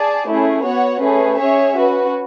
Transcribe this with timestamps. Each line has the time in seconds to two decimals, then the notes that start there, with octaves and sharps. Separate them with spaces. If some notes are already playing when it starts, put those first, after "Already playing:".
Already playing: G#4 D5 A5
0.27 A3 C#4 E4 G#4
0.64 B3 F#4 C#5 F#5
1.01 A3 C#4 G#4 B4
1.38 C#4 G#4 C#5 E5
1.76 C#4 F#4 B4